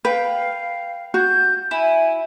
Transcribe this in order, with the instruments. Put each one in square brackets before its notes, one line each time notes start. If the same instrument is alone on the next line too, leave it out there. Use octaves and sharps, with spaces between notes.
[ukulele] B4 [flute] F5 [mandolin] G5
[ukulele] F#4 [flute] G6
[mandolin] E4 [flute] G#5